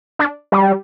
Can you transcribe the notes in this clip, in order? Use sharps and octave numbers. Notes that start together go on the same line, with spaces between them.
D4
G3